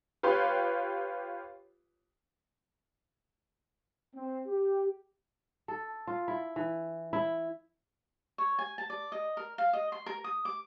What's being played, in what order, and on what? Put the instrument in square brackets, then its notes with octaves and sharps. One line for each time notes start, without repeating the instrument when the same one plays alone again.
[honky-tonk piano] F4 G4 B4 C#5 C6
[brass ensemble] C4
G4
[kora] A4
F4
E4
E3
E4
[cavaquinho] C#5
G#5
A5
D5
D#5
A#4
F5
D#5
C6
A#4
D#6
D6